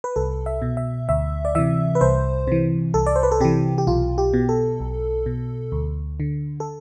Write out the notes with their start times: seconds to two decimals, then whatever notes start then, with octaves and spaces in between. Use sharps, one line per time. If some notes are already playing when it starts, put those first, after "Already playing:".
0.04 B4
0.16 C2 A4
0.46 E5
0.62 B2
0.77 E5
1.09 D2 E5
1.45 D5
1.55 C3 E3 E5
1.95 B4
2.01 C2 C5
2.48 C3 E3
2.94 C2 A4
3.06 D5
3.16 C5
3.23 B4
3.32 A4
3.40 C3 E3 G4
3.78 G4
3.87 B1 F4
4.18 G4
4.34 B2
4.49 A4
4.80 B1
5.26 B2
5.72 D2
6.20 D3
6.60 A4